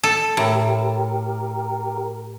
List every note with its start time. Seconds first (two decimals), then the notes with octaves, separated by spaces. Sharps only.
0.04 A4
0.37 A2 G4 A#4